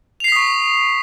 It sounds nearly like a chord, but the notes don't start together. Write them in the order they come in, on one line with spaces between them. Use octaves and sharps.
F7 C7 B6 D#6 C#6